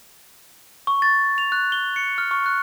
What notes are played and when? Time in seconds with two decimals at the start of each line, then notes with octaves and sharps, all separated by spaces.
0.87 C#6
1.02 A6
1.38 F7
1.52 F#6
1.72 G7
1.96 C#7
2.18 F6
2.31 C#6
2.46 F#6